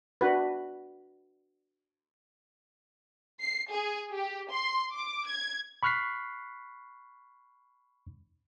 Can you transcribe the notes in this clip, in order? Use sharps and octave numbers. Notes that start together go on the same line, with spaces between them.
D4 F#4 B4
C7
G#4
G4
C6
D6
G#6
B5 C#6 F6 F#6 B6 C7